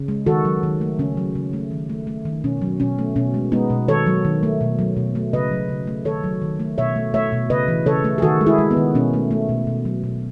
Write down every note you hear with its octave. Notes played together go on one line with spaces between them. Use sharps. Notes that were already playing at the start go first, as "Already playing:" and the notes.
Already playing: C#3
G#3
D#3 F#4 A4
F#3
D#3
A3
C#3 C#4
F#3
C#3
A3
D#3
A3
A3
D#3
B2 C#4
F#3
B2 C#4
A3
B2 C#4
G#3
G#3 B3 D#4
B2
D#3 A4 C#5
F#3
D#3
A3
B2
F#3
B2
A3
C#3 B4 D#5
F#3
C#3
A3
D#3 A4 C#5
F#3
D#3
A3
B2 C#5 E5
A3
A3 C#5 E5
B2
C#3 B4 D#5
E3
C#3 A4 C#5
A3
G#4
D#3 F#4 A4
G#3
E4 G#4
G#3
B3
D#3
B2 C#4
A3
A3
B2
B2
F#3
B2